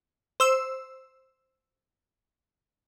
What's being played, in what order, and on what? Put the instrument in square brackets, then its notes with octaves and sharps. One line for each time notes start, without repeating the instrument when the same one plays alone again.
[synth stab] C5 E6